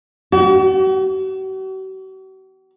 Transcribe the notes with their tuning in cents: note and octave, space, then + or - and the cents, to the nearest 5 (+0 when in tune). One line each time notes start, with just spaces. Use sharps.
F#4 +45